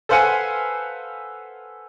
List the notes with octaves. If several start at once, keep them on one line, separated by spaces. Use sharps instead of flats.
A4 B4 C5 F5 F#5 G#5